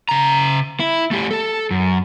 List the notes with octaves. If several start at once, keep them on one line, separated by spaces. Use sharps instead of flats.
C#3 A#5
E4
A3 G4
A4
F#2